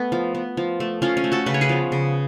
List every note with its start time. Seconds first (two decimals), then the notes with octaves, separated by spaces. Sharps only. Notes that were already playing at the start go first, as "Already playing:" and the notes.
Already playing: A3 B3
0.12 F3
0.35 B3
0.57 F3
0.80 A3
1.02 F3 C#4 F4
1.17 C#4
1.24 A3
1.32 F#4 A4
1.46 C#3 B4
1.54 C#5
1.61 G#4 B4
1.69 F3 B3
1.92 C#3